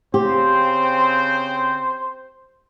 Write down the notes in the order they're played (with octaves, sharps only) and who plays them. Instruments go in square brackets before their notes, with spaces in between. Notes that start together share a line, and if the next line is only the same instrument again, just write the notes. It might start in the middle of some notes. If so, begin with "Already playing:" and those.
[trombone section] C#3 C4 [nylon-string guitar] G4 [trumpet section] C5